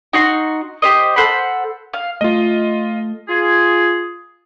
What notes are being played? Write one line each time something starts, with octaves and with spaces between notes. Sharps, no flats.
D#4 F#4 C6
G4 C5 D#5
A4 C5 F#5 B5
F5
A3 F4 D#5
F4 G#4